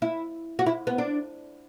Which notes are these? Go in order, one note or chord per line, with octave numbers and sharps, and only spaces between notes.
E4
F#4
E4
B3
D4